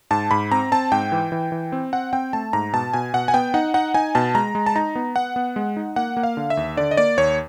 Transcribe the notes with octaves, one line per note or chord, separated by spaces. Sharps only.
G#2 A5
G#2 B5
C4 A#5
C4 A5
G#2 G5
E3
E3
E3
C4
C4 F#5
C4 G5
A3 A5
G#2 A#5
B2 A5
B2 G#5
B2 F#5
G#5
B3 G5
D#4 F#5
D#4 F#5
D#4 G#5
B2 A5
G#3 A#5
G#3
A5
D#4 A#5
B3
B3 F#5
B3
G#3
D#4
A#3 F#5
A#3
F5
D3
E5
D#2
D3 D5
D#5
A#3 D5
D#2 C#5